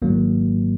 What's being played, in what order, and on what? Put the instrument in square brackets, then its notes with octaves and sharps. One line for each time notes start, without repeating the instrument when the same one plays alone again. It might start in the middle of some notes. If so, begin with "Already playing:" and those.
[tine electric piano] G#1 G#2 F#3 A#3